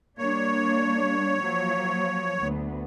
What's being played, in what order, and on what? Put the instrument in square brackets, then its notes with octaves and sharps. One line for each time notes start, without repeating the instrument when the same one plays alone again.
[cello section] G3 A#3 D4 [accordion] C#5
[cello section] F3 F#3 A#3
D2 B3